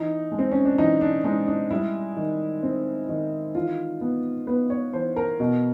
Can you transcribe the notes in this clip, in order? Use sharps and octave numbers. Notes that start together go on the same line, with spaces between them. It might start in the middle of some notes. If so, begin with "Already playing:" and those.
Already playing: E3 D#4
G#3
C4
C#4
D4
E3 D#4
D4
G#3 D#4
D4
G3 E4
D#3
C4
D#3
E3 F4
B3
B3 B4
C#5
E3 C5
A#4
B2